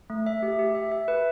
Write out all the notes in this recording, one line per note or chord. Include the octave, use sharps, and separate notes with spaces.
A3
E5
G4
G4
E5
E5
B4